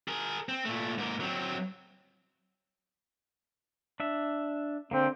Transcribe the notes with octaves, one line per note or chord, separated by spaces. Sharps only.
G#4 A#4
C4
A#2 A3
G#2 A#3
F#3 C4
D4 E5
D3 A#3 C4